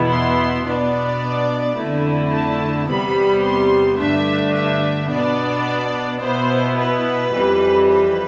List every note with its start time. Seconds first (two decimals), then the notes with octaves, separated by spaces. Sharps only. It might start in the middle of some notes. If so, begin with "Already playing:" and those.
Already playing: E2 B2 B3 E4
0.10 C6
0.65 B2 B3 D4 D5
1.76 F2 D3 A3 E4
2.32 A5
2.87 E2 C3 G3 B3 B5
3.43 C6
3.99 G2 D3 A3 D4 E5
4.54 E5
5.10 B2 B3 D4 D5
6.21 B2 B3 E4 C5
6.78 B4
7.33 F2 E3 G3
7.89 B4